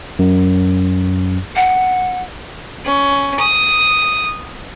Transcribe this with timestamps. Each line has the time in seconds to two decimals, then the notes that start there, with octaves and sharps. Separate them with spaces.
0.19 F#2
1.56 F#5
2.85 C#4
3.40 D#6